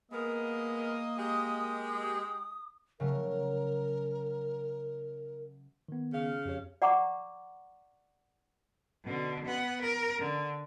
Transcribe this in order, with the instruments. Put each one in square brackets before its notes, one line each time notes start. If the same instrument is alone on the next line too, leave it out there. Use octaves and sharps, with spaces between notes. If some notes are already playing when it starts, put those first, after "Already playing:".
[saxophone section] G#3 B3 A#4 [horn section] A#3 D#5
[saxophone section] G#3 G4 [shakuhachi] D#6
[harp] C#3 F#3 A3 [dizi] A#4
[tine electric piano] D#3 B3
[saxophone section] C#3 F5
[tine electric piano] F2 G4 C#5
[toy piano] D5 F#5 A#5 C#6 D6
[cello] B2 D3
B3 F#5
A#4
D3